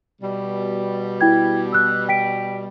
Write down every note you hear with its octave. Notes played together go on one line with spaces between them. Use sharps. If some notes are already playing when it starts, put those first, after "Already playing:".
B2 G3
E4 G5 G#6
E6 F#6
G5 B6 D7